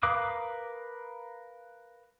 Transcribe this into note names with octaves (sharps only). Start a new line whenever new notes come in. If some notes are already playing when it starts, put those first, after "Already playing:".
A#4 B4 F5 D6 D#6